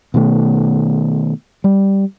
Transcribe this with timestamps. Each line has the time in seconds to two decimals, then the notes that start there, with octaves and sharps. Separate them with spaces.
0.14 B2 D#3 A3
1.64 G3